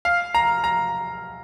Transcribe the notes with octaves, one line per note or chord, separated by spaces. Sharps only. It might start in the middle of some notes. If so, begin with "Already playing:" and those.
F5
A#5
A#5